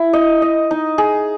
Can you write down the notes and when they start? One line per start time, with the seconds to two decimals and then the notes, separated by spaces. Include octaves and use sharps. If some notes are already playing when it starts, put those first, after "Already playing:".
Already playing: E4
0.13 D#5
0.42 D#5
0.71 D#4
0.98 G#4